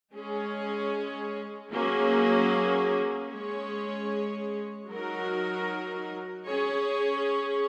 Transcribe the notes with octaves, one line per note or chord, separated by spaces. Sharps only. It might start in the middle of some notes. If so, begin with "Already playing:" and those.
G#3 C#4 G#4 C#5
F#3 A#3 C#4 G#4
G#3 C#4 G#4 C#5
F#3 D#4 F#4 A#4
C#4 G#4 C#5